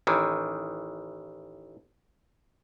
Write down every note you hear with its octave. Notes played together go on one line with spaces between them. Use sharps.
A1 D#3 E3